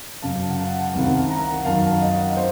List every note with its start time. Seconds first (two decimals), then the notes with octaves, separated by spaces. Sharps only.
0.22 F#2 C#3 F5 A5
0.50 F#5
0.58 F5 A5
0.82 F#5
0.94 C2 C3 D#3 F5 A5
1.29 F#5 A#5
1.65 F#2 D#3 F5 A5
1.93 F5
2.02 D#5 F#5
2.36 C5 D#5